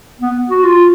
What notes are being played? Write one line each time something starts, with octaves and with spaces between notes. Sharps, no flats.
B3
F#4
F4